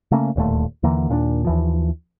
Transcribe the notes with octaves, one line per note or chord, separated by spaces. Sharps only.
C#3 A3 A#3 C#4
D1 D#2 A#2 A3
D#2 D3 E3 A#3
D#2 A#2 C#4 D4
D#2 E3 F3